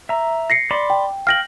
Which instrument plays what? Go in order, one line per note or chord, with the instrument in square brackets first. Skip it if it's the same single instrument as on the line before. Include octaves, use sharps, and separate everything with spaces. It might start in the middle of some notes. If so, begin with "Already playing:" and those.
[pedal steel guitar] E5 A#5
[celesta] A#6 C7 C#7
[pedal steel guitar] D5 B5 C6
[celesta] G5
[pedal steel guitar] F5 G5 [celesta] F6 A#6 F#7